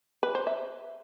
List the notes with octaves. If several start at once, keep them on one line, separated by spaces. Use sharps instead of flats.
B4
C5
E5